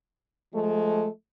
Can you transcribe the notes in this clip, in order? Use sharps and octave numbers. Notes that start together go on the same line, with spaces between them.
F3 G#3 A3